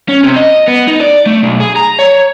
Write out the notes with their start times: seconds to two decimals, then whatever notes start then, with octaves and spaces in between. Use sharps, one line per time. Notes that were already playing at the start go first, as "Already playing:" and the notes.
0.08 C#4
0.24 C3
0.36 D#5
0.67 B3
0.87 D#4
1.01 D5
1.26 A3
1.43 B1
1.60 G#4
1.76 A#5
1.99 C#5